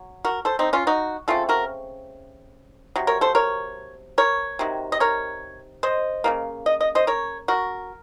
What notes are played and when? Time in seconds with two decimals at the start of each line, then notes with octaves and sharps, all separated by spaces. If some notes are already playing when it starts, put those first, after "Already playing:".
Already playing: F#3
0.25 F#4 A#4
0.45 A4 C5
0.59 C4 D#4
0.73 C#4 F4
0.87 D#4 F#4
1.28 C#3 A3 C4 F4 A4
1.49 F#4 A#4
2.96 C3 F#3
3.07 A#4 C#5
3.21 A4 C5
3.35 A#4 C#5
4.18 A#4 C#5
4.59 C3 D#3 F#3
4.92 D#5
5.00 A#4 C#5
5.83 C5 D#5
6.24 C#3 F3 A#3
6.66 D#5
6.81 D#5
6.95 C5 D#5
7.07 A#4 C#5
7.48 F#4 A#4